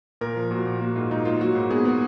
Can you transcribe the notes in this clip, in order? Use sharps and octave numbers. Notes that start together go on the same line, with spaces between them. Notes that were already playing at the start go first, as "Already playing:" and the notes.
A#2 A#4
F3
A#2 F#4
A#2
A#3 F#4
G#2 F4
G#2 D#4
A#3 F4
F#3 F#4
G#2
B3 G#4
B3